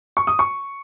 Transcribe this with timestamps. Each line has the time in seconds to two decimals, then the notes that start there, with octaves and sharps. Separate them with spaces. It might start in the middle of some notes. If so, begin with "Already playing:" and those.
0.17 C#6
0.27 D#6
0.39 C#6